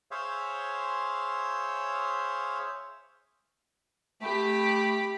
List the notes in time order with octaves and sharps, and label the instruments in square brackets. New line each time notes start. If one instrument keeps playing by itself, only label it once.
[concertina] G#4 C5 C#5 E5 F5
[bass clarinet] A3 [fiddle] G4 B5